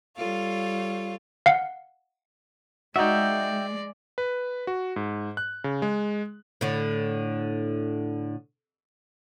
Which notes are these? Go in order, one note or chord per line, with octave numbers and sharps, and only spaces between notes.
G3 F4 A4 C#5 F5
F5 F#5
G#3 D#4 F#4 D5 E5 G5
B4
F#4
G#2
F#6
C#3
G#3
A2 D3